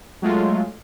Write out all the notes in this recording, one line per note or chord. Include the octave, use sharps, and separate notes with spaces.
F#3 G#3 A3 F4